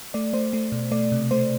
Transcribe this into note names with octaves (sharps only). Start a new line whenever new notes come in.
A3 D5
A3 C5
A3
B2
A3 D5
C3
A3 C5